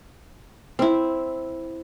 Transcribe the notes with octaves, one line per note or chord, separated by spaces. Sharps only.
C4 E4